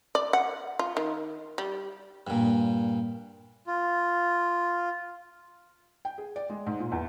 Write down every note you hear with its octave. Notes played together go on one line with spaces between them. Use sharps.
D5
F#5
F4
D#3
G3
G2 A#2
F4
G5
G#4
D5
G#3
G#2
A#2
E2